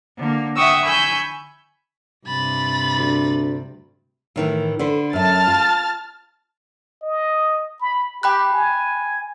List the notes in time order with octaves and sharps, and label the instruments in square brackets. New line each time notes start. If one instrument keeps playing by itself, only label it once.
[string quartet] D3 A#3
E5 F#5 G5 C#6 D#6 E6
G#5 B5 C#6 E6 G6
[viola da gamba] G2 C3 [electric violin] B5 A6
[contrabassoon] D2
[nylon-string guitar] A2 D#3 E3
D3 B4 C5
[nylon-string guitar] F#2 E5 [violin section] A5 F6 A6
[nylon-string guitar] F4
[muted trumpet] D#5
B5
[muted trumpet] G4 [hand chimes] G5 B5 F#6
[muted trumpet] G#5